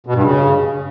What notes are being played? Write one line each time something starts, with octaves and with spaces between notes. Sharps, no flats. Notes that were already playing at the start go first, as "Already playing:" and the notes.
B2
G2
C#3